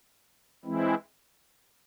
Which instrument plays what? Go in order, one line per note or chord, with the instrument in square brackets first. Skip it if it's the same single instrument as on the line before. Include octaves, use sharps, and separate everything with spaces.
[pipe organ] E3 G#3 C4 E4